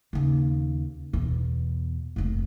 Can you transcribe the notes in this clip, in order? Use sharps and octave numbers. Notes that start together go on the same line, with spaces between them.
D#2 C#3
E2 B2
F1 A#2